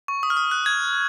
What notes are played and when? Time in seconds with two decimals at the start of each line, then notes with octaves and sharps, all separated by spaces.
0.08 C#6
0.23 D#6
0.30 F6
0.37 D#6
0.51 F#6
0.66 G#6